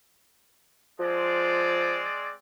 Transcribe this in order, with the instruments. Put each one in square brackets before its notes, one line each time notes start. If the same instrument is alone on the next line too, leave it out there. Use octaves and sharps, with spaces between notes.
[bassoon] F3 [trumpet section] G#3 C4 D5